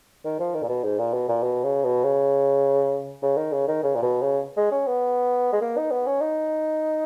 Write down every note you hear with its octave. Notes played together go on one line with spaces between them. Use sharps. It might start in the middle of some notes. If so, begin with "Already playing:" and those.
D#3
F3
D#3
A#2
B2
G#2
A#2
B2
A#2
B2
C#3
B2
C#3
C#3
D#3
C#3
D#3
C#3
A#2
B2
C#3
G#3
C#4
B3
G#3
A#3
D#4
B3
C#4
D#4